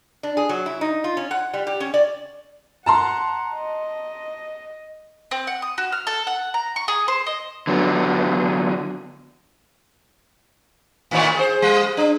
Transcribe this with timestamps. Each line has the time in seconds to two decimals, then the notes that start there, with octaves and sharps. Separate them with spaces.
0.23 D4
0.37 G#4
0.49 F#3
0.66 E4
0.81 D#4
1.04 F4
1.17 C#4
1.31 F#5
1.54 G3
1.67 G4
1.80 C#4
1.94 D5
2.86 F#5 A5 A#5 C6
3.57 D#5
5.31 C4
5.47 F#5
5.62 D#6
5.78 F#4
5.92 F6
6.07 A4
6.27 F#5
6.54 A#5
6.76 C#6
6.88 G#4
7.08 C5
7.26 D#5
7.67 D3 F#3 B3
11.11 A2 D#3 C#5
11.35 G#4 C5
11.62 G3
11.97 D4